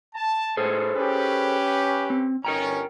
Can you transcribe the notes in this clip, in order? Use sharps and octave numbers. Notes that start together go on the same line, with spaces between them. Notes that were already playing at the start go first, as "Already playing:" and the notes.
A5
A2 G#3 G#4 A4 C5
C#4 G4 B4
C4
G1 C#4 A#4 G5 A#5